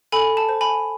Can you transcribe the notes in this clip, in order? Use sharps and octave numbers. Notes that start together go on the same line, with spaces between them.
A4 G#5 B5
A5
C5
G#5 B5